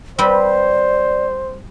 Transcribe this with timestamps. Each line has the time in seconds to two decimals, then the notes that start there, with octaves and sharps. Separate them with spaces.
0.19 G3 C4 B4 C5 D5